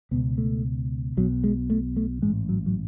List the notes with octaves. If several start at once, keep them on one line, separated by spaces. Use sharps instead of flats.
C#2 B2 B3
A3
B1 B2 F#3
G#3
A3
A3
A1 G#2 G#3
F#3
F#3